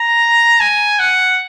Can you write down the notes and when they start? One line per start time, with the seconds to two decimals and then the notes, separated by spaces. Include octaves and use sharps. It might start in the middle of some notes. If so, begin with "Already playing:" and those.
Already playing: A#5
0.60 G#5
0.99 F#5